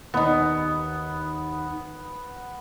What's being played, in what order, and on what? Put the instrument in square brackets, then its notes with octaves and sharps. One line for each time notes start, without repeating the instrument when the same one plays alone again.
[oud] D#2 D#4 [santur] B3